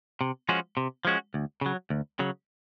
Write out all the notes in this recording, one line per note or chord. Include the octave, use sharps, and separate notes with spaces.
C3
F3 G#3 C#4 F#4
C3
F3 G#3 C#4 F#4
D2
C#3 F#3
D2
C#3 F#3